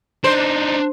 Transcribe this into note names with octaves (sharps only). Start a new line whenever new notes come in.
D4 D#4 C5